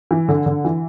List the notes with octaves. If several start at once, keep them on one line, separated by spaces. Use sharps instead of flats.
E3
D3
D3
E3